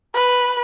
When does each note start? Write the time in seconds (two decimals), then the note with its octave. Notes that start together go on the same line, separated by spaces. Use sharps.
0.15 B4